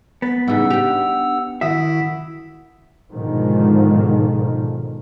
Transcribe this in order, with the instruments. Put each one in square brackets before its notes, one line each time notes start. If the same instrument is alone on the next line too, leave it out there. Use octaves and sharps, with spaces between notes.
[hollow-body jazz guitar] B3 [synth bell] A6 B6
[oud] C#3 E3 [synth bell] G3 D#4 [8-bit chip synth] F#5 E6
[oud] D4 G4 [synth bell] F7
[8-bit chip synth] D#3 E4 B6 [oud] F#4 [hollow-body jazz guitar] E5 [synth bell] F#5 D#6 E6
[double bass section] G#2 B2 D3 D#3 F3 G#3